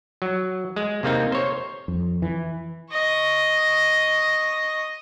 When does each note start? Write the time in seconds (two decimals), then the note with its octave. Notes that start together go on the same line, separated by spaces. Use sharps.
0.22 F#3
0.76 G#3
1.03 C3 A#3 C4 D#4
1.32 C5 C#5
1.88 F2
2.22 E3
2.91 D#5 C#6